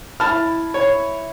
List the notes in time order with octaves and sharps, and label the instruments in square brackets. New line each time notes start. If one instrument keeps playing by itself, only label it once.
[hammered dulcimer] E4 [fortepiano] A5 F6
[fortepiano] C#5